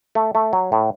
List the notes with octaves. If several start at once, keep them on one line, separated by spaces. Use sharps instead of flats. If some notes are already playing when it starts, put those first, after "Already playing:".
A3
A3
F#3
A2